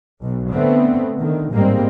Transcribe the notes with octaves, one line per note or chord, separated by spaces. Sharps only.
B1
D3 A3 B3 C4
D3 D#3
A1 G#2 G3 G#3 A#3 C4